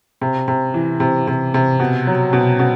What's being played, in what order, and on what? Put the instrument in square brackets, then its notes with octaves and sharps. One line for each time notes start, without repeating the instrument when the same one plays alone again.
[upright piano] C3
C3
E3
C3
C3
C3
B2
F#3
B2
B2